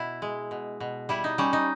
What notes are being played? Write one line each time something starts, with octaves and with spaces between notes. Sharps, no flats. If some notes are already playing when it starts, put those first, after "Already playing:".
Already playing: B2 E4
G#3
B2
B2
G3 E4
D#4
G3 C#4
D#4